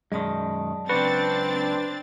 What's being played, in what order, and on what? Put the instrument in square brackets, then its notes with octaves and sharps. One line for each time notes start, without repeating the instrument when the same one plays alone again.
[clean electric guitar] F#2 B2 D#3 [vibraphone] F#3 D5 A5 [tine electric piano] G#3
[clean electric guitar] C#2 F#4 [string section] C4 D4 A6 [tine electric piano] B4